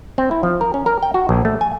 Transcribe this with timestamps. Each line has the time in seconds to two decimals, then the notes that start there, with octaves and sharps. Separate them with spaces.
0.18 C4
0.31 E4
0.43 F3
0.61 A#4
0.74 C#4
0.86 A#4
1.03 G5
1.14 F#4
1.29 A#1
1.45 A3
1.61 G#5